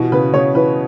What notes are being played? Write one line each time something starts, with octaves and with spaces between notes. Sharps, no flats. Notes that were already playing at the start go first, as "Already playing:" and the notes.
Already playing: B2 E3 F#4
C#3 B4
C#3 C#5
E3 B4